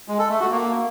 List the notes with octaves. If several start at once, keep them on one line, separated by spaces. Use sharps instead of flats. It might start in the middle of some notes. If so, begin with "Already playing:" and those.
G#3
A4
A3
F#4
A#3